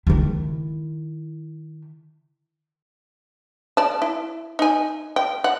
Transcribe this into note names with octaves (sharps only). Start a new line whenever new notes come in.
D#3 E4
D5 A5
E4
D#4 G#5
G5
F#5